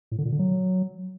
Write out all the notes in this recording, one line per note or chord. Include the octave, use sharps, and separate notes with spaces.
A2
D3
A#2
D3
F#3